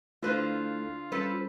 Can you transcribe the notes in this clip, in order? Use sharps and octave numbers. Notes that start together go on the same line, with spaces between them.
D3 A3 E4 F4 A4 B4 C5
G3 C#4 A4 B4 C5